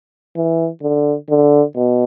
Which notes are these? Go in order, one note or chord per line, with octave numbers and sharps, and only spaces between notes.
E3
D3
D3
B2